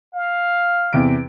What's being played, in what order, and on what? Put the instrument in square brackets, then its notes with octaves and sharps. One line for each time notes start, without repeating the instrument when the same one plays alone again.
[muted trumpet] F5
[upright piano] E2 C3 D7